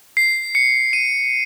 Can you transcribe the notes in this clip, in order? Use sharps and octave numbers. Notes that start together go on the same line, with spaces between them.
C7
C#7
D#7